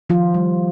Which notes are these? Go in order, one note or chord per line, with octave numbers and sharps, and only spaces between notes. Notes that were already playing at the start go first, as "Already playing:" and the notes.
D#3 F3 F4
G3